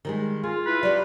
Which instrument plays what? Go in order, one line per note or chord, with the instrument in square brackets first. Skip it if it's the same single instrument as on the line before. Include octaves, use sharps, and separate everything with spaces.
[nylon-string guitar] D#3 G3 G#3
[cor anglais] F4 [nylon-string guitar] G#4
[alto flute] E4 [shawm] B4
[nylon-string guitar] F#3 G4 [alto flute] D5